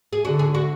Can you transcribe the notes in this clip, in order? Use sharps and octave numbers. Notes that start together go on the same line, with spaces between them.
G#4
D3 F#4
G#4
F#4